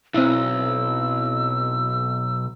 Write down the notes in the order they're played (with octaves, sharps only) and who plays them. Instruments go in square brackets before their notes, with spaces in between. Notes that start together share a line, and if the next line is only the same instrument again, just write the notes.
[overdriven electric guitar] B1 [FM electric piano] C4 E4 [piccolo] E6